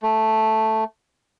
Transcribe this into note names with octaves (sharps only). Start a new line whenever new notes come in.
A3